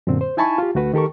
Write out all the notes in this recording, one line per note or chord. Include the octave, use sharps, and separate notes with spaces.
F#2 A#2 D3 C4
C5
D#4 E4 G#5 A5 B5 C#6
F4 G4
D2 A3 F#4 B4
D#3 G4 A4 A#4 C#6